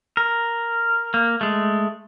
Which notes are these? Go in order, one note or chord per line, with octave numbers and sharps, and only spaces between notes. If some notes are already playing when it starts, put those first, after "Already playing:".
A#4
A#3
G#3 A3